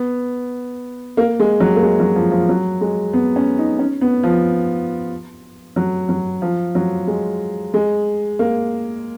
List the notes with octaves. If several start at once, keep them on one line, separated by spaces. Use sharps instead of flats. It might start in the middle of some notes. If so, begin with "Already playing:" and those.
Already playing: B3
A#3
G#3
F#3
A#3
G#3
F#3
F3
F3
F#3
G#3
B3
C#4
D#4
C#4
B3
F3
F#3
F#3
F3
F#3
G#3
G#3
A#3